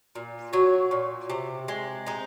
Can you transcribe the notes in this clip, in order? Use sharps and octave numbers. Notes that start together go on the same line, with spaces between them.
A#2
F#3 C#5
A#2
C3
G#3
G#3 D#4